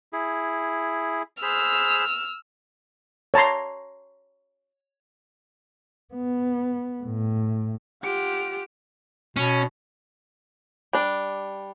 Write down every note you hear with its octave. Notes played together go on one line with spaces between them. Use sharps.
E4 G#4
G#4 C5 B5 E6 F6
C#5 A5 A#5 C6
B3
A2
F4 G4 F#5 D7
B2 C#4
G3 D4